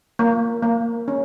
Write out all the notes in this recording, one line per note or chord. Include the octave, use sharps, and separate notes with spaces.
A#3
A#3
C#4